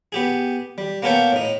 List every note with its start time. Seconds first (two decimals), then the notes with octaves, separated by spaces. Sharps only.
0.12 B3 G4 G#4
0.78 G3
1.03 A#3 B3 A4 A#4 C#5 G5
1.32 A2 D#4